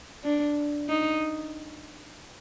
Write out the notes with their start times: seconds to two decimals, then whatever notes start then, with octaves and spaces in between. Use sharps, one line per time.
0.24 D4
0.89 D#4